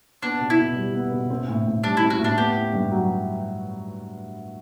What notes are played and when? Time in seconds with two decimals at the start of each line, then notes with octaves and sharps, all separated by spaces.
0.23 B3 D4
0.40 B2
0.50 E4
0.59 B2
0.76 G3
0.94 B3
1.12 B2
1.30 C4
1.48 A2
1.66 A2
1.84 G3 D4
1.97 C4 E4
2.10 F#4
2.19 A2
2.24 D4
2.37 B3 G4
2.55 E4
2.73 G2
2.92 F#3